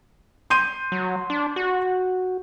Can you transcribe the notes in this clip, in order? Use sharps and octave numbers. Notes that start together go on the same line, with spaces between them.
C6 G6 D#7
F#3
D4
F#4